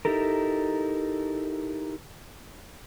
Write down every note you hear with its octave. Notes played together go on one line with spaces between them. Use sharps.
D#4 E4 G4 A4 A#4